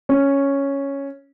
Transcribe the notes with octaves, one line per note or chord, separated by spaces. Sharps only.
C#4